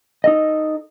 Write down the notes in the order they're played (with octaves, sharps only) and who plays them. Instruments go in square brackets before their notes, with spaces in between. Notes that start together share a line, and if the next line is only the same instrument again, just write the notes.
[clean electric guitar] D#4 A4 D#5